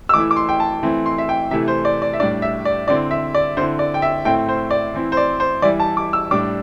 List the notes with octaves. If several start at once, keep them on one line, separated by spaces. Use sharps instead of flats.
E6
E3 A3 E4 D6
D6
C6
G5
A5
E3 A3 C4 E4
C6
E5
G5
C3 E3 A3 E4 E5
C5
D5
D5
E5
A2 G3 D4 D5
E5
D5
D3 C4 E4 D5
E5
D5
D3 C4 E4 C5
D5
G5
E5
A2 A3 C4 E4 G5
C5
D5
E3 C4 E4
C5
D5
C5
E3 G3 E4 D5
A5
D6
E6
A2 G3 D4 D6